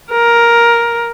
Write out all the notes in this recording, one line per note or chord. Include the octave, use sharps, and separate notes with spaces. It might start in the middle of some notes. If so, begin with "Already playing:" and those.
A#4